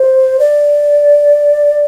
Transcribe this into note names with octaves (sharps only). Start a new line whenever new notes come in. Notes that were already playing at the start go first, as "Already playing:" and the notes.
Already playing: C5
D5